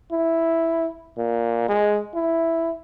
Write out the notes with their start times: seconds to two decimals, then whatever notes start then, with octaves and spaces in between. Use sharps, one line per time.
0.12 E4
1.17 A#2
1.68 G#3
2.15 E4